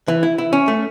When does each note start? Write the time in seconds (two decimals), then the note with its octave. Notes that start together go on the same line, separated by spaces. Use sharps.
0.08 E3
0.23 E4
0.38 E4
0.53 C#4
0.68 A3